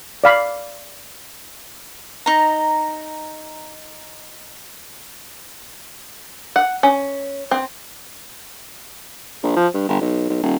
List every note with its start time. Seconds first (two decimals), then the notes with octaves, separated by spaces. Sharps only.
0.24 D5 F5 B5
2.26 D#4 A#5
6.56 F#5
6.83 C#4
7.51 C4
9.43 A#1
9.56 F3
9.74 G2
9.88 G1
10.01 B1
10.30 B1
10.43 D#1